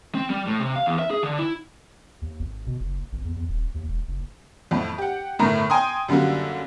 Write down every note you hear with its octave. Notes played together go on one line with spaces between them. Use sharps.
C4
G3
A2
C3
F5
E2
E5
G#4
D3
E4
D#2
G#1
B2
F#1
G#1
E2
E2
D#1
D#2
E1
F#1
F2 A2
G4 F#5
G1 A2 A3 A#4 A#5
G5 G#5 A#5 C6 D#6
F#2 D3 G3 A#3 F#4